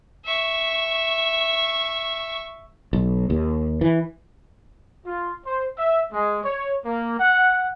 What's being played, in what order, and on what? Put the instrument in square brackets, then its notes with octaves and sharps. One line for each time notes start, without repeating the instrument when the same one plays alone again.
[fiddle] E5 C#6
[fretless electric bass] B1
D#2
E3
[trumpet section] F4
C5
E5
G#3
C#5
A#3
F#5